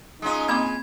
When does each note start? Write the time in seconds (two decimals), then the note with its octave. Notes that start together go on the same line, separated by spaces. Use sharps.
0.22 G#3 C#4 D#4 F4
0.48 A#3 C4 B5 D6 G#6